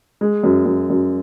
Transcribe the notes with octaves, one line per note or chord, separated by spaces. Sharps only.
G#3
F#2
F#2
F#2